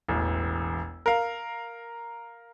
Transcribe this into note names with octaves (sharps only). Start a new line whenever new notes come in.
E1 A1
A#4 F5